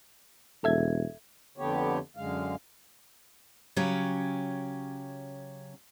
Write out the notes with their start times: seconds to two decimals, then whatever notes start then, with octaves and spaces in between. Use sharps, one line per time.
0.64 E1 A4 E5 G#6
1.58 F2 D3 A3 B3 G4 C#5
2.16 F#2 D3 G#3 F5
3.76 C#3 F#3 C#4 G4